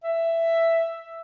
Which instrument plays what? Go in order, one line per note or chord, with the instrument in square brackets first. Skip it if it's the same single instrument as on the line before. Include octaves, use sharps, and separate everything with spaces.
[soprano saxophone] E5